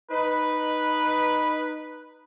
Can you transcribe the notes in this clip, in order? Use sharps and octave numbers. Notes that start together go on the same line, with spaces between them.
D#4 B4